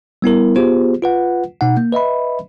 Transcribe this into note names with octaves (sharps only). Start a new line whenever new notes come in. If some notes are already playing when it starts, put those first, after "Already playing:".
G3 B3 E4 A#4
B3 F4 G4 G#4 C5
F4 B4 F#5
B2 D#4 F#5
A#3
B4 D#5 E5 B5